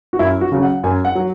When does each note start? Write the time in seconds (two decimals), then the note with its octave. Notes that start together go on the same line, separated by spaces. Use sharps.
0.13 F#4
0.19 F#2 E4
0.41 F#4
0.52 C#3 F#3
0.62 F#5
0.83 F#2 G#5
1.05 F#5
1.15 F#3